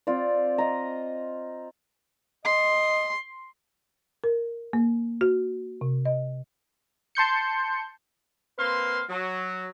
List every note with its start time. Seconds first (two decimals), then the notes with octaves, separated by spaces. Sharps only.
0.07 C4 F4 D5
0.58 D#5 A#5
2.45 D#5 C6
4.24 A#4
4.73 A#3
5.21 F#4
5.81 C3
6.05 D#5
7.15 A5 C6 G6 C#7
8.58 A#3 C4 B4 F5 C6
9.09 F#3